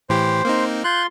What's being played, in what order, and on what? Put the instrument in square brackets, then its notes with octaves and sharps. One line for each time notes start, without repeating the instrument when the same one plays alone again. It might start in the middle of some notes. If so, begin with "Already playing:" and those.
[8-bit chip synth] A2 E3 G4 [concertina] C5
[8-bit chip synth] A#3 C4 D#4
[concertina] F4 C6 [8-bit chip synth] F#6 G6